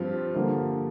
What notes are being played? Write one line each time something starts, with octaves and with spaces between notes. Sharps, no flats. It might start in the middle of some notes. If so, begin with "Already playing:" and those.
Already playing: G2 F3 C4 F4
G2 D3 F3 A#3